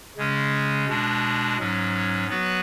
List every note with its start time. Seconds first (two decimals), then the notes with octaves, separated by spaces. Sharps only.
0.17 C#3 G#3 C#4
0.87 B2 G#3 D4
1.58 G#2 F#3 C#4
2.28 F#3 B3 F#4 B4